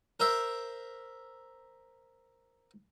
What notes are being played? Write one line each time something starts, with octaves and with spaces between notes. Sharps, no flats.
A#4 C5 E5